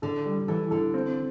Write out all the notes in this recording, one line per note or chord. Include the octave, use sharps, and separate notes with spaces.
D3 A4
G3
E3 A4
D3 A4
C4